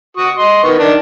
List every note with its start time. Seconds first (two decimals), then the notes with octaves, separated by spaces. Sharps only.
0.17 F#4 C#6 D#6
0.38 D#5 C6
0.63 D#3 B3 C#6
0.78 D#3 D4